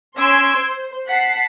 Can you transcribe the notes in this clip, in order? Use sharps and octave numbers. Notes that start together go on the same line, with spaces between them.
C#4 C6 E6 G#6 D7
C5
F#5 A5 B6 C7